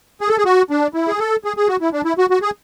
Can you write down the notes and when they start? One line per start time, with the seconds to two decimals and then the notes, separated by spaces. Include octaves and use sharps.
0.21 G#4
0.29 A4
0.38 G#4
0.45 F#4
0.70 D4
0.94 E4
1.08 G#4
1.19 A4
1.44 G#4
1.57 G#4
1.68 F#4
1.81 E4
1.93 D4
2.05 E4
2.18 F#4
2.30 F#4
2.42 G#4